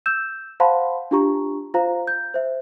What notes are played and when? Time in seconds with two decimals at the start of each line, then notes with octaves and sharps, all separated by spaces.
0.06 E6 G6 E7
0.60 C5 F5 F#5 A5 B5 C6
1.11 D4 F4 G4 A#5 C#6
1.74 F4 C5 F5 A#5
2.07 G6
2.34 C5 E5